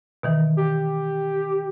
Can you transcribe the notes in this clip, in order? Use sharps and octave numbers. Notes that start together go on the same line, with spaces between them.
B2 D#3 E3
G4